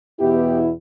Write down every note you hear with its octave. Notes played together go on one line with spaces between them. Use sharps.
E2 B2 B3 E4 G4